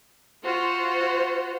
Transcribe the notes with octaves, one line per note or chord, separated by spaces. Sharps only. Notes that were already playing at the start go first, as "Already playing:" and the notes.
F4 F#4 C5